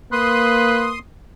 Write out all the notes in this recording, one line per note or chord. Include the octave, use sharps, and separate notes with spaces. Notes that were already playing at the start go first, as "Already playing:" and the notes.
A#3 B4 C6 D#6